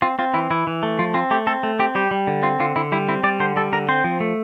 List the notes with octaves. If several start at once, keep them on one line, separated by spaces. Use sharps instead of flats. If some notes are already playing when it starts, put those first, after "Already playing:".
C4 F4
C4 F4
E3 E4
E3 E4
E3
A3
F3 F4
C4 F4
A3 G4
C4 A4
A3
C4 G4
G3 G4
G3
D3
C4 F4
D3 F4
D3 E4
G3 E4
C4 E4
G3 D5
D3 C5
G3 A4
D3 A#4
C4 C5
F3
A3